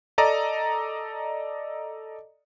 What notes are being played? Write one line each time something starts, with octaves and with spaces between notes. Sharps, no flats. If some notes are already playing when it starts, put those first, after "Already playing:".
A4 D5 D#5 A#5